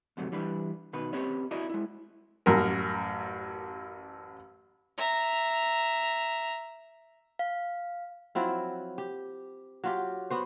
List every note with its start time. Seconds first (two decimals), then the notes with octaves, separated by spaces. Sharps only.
0.17 D2 G#2 C3 F#3 A3
0.32 E3 G3 D4 B4
0.93 B2 D#3 B4
1.13 C4 C#4 G4 B4 C#5 D#5
1.51 E4 F#4 A#4 D5 D#5
1.69 G#3 E4
2.46 A1 F#2 A#4
4.98 E5 A#5
7.39 F5
8.35 F3 F#3 C4 E4
8.98 G4
9.84 F#3 F4 G4
10.30 B3 F#4 C5